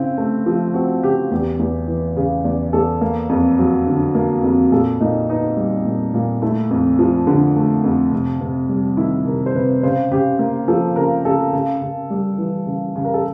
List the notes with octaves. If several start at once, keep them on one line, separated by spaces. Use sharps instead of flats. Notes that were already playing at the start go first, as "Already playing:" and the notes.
Already playing: C#3 C4 E4
A3
F3
C4 F#4
C#3 G4
E2 G4
E2
E3
C#3 G#4
E2 D5
E2 A4
A#3
F2
F#3
D3
A#3
F2
A#2 A4
A#2 D#4
B3 D#4
G3
A#2
A#2
A3 E4
F2
F3
D3
A3
F2
C3
C3
G3
D#3 E4
C3 A#4
C5
C3 B4
C#3 C5
C#3 G4
A#3
F3 A4
C#3 A#4
C#3 A4
C#3
C#3
G3
E3
C#3
C#3
A#4
A4